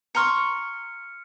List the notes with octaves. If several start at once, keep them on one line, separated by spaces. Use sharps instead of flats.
A#5 C6 C#6 F6 C#7